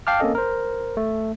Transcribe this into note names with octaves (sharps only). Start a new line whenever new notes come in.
F5 G5 A5 D6 F6
A#3 C4 C#4 A4 D#5
A#4 C5
A3